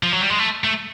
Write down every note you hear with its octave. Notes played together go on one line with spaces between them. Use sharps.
F3
F#3
G3
G#3
A3
A3